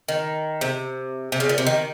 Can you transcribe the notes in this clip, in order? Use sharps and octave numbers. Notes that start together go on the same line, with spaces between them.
D#3
C3
C3
C#3
A#2
C3
D#3